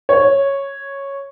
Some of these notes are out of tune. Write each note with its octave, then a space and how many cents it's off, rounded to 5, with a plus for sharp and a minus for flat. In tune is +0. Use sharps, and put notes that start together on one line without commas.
C#5 -5